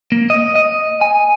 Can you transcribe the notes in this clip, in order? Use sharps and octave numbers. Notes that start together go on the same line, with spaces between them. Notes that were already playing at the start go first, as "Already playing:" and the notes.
A#3
D#5
D#5
G#5